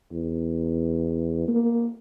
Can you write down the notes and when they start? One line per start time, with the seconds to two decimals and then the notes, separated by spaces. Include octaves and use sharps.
0.12 E2
1.48 A#3